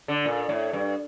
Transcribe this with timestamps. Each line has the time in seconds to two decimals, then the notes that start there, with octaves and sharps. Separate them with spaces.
0.08 D3
0.25 A#2
0.49 A2
0.73 G2